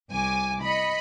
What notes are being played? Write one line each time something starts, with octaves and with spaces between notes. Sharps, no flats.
C2 G#5 D6
D#5 B5 C#7